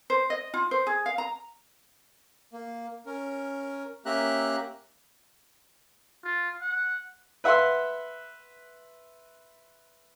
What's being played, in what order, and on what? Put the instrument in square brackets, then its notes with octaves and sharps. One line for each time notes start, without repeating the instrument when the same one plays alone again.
[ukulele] C5
D#5
F4
C5
G#4
F5
A#5
[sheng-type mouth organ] A#3
C#4 A#4
A#3 C#4 G4 E5 A#5 F#6
[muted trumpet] F4
F#5
[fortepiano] B4 E5 F#5 B5 C6